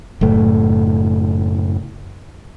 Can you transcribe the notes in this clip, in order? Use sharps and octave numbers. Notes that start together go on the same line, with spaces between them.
F#1 A2 A3